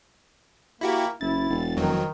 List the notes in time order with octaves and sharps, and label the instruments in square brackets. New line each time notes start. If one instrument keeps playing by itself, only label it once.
[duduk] A#3 [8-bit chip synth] E4 F#4 G4
[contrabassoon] F#1 [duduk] E4 [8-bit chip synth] A6
[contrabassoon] E1
[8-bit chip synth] F2 F#3 [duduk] D#3